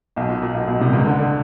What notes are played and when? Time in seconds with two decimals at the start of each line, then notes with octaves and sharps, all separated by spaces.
0.16 B1 B2
0.29 A#2
0.42 A#2
0.54 B1 B2
0.67 B1 B2
0.80 C2 C3
0.93 C#2 C#3
1.06 D2 D3
1.19 D3